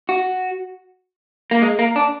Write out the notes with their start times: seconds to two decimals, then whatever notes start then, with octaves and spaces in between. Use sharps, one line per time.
0.09 F#4
1.51 A#3
1.62 G#3
1.79 A#3
1.96 D4